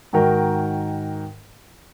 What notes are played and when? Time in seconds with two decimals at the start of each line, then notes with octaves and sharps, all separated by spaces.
0.13 G#2 D#3 F#4 A#4 G5